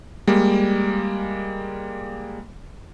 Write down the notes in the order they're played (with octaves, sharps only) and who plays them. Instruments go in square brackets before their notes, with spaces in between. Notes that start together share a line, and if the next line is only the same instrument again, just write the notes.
[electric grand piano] G3 G#3 A#3